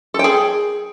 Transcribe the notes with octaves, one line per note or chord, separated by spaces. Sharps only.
G#4 A4 G5